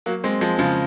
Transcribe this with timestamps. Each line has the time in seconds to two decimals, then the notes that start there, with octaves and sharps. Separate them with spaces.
0.06 F#3 A#3
0.24 G#3 C4
0.41 F3 G#3
0.59 C#3 F3